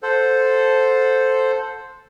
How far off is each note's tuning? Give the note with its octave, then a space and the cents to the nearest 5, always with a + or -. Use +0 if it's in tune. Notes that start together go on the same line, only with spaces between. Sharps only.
A4 +0 C5 +0 F#5 -30